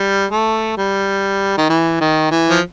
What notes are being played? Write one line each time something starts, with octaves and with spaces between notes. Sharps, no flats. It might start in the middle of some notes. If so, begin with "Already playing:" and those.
Already playing: G3
A3
G3
D#3
E3
D#3
E3
F3